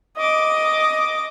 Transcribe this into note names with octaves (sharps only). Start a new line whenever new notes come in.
D#5 D6